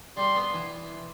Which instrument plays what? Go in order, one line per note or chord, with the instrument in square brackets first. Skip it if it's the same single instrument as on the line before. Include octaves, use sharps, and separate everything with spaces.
[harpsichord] G3 [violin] C6
[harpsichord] B3
E3